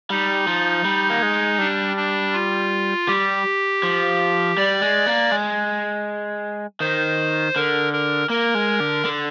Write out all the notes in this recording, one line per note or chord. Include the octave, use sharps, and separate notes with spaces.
G3 D#4
F3
G3
A#3
G#3
G3 D4
D4
F4
G3 G4
F3
G3 D5
G#3
A#3
G#3
D#3 C5
D3 A#4
A#4
A#3 A#4
G#3
D3
D3